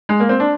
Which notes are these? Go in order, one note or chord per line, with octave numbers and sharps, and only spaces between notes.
G#3
A#3
C4
D4